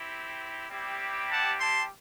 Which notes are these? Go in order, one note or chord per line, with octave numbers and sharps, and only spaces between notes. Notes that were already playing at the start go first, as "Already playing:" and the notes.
Already playing: C4 E4 G4
G3 C4 E4 G4
F#5 A5
A5 C6